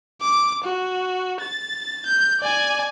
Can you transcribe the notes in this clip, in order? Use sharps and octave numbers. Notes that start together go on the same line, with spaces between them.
D6
F#4
A6
G6
D5 G#5